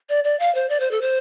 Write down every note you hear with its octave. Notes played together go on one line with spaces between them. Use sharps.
D5
D5
F5
C5
D5
C5
A4
C5